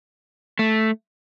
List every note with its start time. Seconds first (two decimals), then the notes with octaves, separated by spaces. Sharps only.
0.59 A3